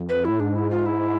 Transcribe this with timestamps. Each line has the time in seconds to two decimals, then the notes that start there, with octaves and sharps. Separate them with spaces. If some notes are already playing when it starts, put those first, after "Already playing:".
Already playing: F2
0.09 B4
0.25 A2 E4
0.40 G#2 D4
0.55 E4
0.70 F4
0.86 E4